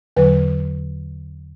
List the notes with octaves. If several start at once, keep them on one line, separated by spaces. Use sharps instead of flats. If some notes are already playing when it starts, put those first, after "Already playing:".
E2 D3 F#3 B4